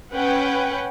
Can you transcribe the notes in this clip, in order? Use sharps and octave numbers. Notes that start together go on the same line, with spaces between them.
C#4 B4 F#5 G5